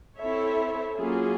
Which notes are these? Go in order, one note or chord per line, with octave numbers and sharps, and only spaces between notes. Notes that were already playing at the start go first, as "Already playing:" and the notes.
C4 E4 A4 C#5 E5
F#3 A#3 C#4 F4 G#4